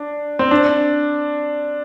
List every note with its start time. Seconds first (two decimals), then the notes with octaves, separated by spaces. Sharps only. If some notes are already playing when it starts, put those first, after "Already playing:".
Already playing: D4
0.39 C4
0.51 D4